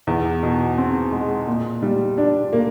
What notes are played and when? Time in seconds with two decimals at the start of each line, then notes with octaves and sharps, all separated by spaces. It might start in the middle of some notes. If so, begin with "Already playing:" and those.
0.07 E2
0.43 B2
0.78 C4
1.12 G#3
1.47 A#2
1.83 G3
2.18 D4
2.53 A#3